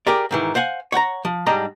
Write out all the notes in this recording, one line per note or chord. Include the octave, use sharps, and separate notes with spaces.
G4 G#4 A#4 D5
G#2 D#3 E3
C5 F5 F#5 G#5
C#5 F#5 G5 A#5
F3
G#2 G3 D4 D#5 A#5